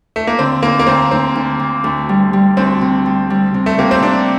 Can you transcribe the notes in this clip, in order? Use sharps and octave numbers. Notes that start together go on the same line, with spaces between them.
A3
A#3
D3 C4
D2 A#3
A#3
D2 C4
D2 C4
D2
D2
D2
G3
G3
D2 C4
C3
G3
G3
C3
A3
C3 A#3
C4
C3 D4